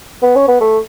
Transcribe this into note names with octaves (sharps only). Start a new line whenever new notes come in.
B3
C#4
B3
A3